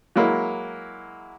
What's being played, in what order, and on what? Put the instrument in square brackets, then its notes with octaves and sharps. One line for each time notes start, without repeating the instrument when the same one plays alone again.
[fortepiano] F#3 G#3 A#3 E4